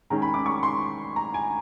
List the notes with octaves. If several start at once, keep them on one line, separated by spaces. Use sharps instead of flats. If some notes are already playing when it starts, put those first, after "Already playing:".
D#3 G#3 C#4 A#5
B5
D6
C#6
C6
A#5
G#5